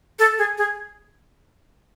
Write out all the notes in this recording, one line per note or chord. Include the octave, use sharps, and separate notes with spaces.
A4
G#4
G#4